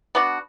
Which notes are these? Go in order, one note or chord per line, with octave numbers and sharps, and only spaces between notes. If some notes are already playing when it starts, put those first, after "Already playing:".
B3 D4 F#4